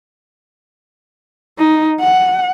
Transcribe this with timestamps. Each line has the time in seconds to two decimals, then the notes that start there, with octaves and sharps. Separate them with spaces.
1.59 D#4
2.00 F#5